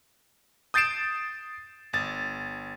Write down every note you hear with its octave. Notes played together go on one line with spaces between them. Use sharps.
D#6 G6 A6 C7 D7 E7
G1 A6